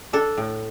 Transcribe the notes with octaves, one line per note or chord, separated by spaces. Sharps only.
D4 A4
A2